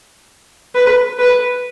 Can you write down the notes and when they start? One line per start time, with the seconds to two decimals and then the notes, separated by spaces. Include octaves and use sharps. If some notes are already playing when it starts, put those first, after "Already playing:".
0.75 B4
1.19 B4